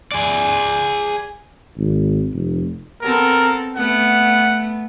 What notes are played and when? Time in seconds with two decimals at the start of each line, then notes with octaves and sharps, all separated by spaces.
0.12 G#4 D5
1.77 G#1
2.33 F1
3.02 B3 C4 A4 A#4
3.75 A3 B3 F#5